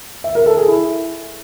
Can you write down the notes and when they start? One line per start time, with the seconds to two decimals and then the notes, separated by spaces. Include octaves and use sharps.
0.24 E5
0.35 A#4
0.46 A4
0.57 G#4
0.68 E4